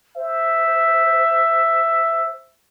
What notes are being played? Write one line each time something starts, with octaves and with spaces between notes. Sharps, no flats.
C5 E5